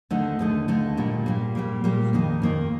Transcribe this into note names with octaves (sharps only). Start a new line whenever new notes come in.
D#2 D3 A3 D#4
D#2 D3 A3 D#4
D#2 D3 A3 D#4
A#2 G3 A#3
A#2 G3 A#3
A#2 G3 A#3
A#2 G3 A#3
F2 D#3 A#3 D#4
F2 D#3 A#3 D#4